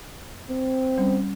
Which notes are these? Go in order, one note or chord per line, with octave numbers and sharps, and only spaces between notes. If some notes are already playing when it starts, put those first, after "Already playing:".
C4
G3 C#4